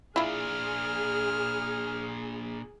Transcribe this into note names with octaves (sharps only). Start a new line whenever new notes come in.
A#2 D4 E4 F4 G#4 F6